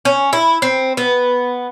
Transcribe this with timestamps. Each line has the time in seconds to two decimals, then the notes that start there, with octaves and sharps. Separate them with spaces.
0.05 C#4
0.33 E4
0.62 C4
0.97 B3